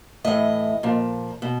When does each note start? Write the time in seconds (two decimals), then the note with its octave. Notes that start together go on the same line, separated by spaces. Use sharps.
0.24 A2 E3 D#5
0.83 A#2 F3
1.42 B2